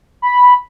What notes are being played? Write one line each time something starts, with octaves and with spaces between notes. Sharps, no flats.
B5